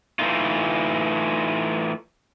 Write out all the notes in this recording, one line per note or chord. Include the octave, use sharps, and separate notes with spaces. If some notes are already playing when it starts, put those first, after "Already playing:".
E3 A3 D#4 F4